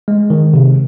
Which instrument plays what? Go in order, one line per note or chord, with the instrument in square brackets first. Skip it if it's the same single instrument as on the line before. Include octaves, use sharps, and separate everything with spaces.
[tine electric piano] G#3
D#3
C3